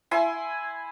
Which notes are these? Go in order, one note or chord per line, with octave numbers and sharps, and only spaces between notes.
E4 G#5 C6